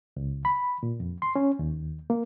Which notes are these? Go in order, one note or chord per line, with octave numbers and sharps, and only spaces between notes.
C#2
B5
A#2
F2
C6
C#4
D#2
A#3